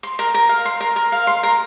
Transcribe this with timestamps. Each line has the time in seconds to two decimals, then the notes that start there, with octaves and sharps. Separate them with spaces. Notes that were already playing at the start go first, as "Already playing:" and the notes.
0.03 C6
0.19 A#4
0.34 A#4
0.49 F5
0.65 C6
0.81 A#4
0.96 A#4
1.12 F5
1.27 C6
1.43 A#4